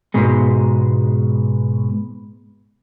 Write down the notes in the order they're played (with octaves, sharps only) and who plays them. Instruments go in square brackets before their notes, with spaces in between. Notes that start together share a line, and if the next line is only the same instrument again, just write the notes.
[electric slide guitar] G#2 B2 G#3